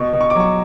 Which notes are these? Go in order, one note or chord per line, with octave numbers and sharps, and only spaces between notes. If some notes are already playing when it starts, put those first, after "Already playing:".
Already playing: B2 C#6
B2
C#6
D6
F#3 C#6